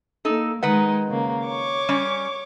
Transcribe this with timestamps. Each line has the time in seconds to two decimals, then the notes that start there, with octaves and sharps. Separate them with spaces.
0.25 A#3 D#4 A4
0.63 D#3 G#3 D#4 B4 F#5
1.06 C#3 A#3
1.47 C#5 C#6 D6
1.89 G3 C#4